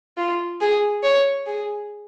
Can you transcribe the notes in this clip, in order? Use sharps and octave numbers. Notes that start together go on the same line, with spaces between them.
F4
G#4
C#5
G#4